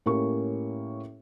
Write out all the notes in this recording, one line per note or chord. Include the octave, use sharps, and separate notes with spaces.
A2 A#3 C#4 G4 C#6